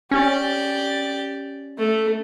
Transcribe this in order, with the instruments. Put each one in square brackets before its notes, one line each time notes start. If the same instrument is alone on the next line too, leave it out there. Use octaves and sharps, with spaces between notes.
[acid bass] C#4 [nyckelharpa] G4 D5
[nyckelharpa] A3